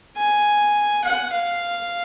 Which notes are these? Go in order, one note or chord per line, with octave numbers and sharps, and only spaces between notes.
G#5
F#5
F5